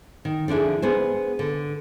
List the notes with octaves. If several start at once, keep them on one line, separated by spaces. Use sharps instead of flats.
D#3
D3 F3 D4 E4 G#4
B3 G#4 C5
D3